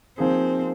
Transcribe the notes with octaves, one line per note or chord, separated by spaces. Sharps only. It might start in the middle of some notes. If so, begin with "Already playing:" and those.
F3 A#3 C4 D#4 G#4